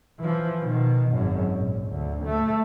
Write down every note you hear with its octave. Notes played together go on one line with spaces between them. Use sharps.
E3 F3
B2 D#3
G#1 F#2
A#1
D2
A3